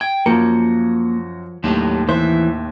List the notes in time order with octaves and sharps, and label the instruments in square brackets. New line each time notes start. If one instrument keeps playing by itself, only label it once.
[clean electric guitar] G5 [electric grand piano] G#6
[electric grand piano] F#2 F#4 C#7 [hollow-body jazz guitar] F3 A#4 [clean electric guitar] A#3
[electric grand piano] D#2 A2 [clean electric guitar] F#3 D4 G4
[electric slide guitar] E3 [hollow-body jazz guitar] C5 [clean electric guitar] E5